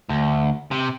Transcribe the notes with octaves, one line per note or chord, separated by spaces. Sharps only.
D2
C3